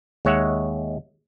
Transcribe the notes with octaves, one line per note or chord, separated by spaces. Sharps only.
D#2 G#3 C#5 E5 F#5